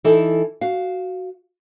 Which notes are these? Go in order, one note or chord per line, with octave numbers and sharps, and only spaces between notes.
E3 D#4 E4 A4
F#4 F5